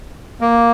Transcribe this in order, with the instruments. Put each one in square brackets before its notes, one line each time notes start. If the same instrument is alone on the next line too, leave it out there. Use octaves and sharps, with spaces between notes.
[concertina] A#3